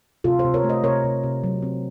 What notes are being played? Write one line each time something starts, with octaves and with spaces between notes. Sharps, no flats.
C3 F4 A4
A4 C5
C3
A#4 C#5
A3
C5 D#5
C3 A#4 C#5
C3
C3
F#3
C4